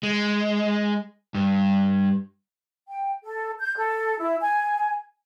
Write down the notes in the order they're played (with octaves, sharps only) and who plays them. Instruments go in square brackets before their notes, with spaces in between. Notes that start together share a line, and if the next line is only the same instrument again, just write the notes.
[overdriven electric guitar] G#3
G2
[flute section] G5
A4
G6
A4
E4
G#5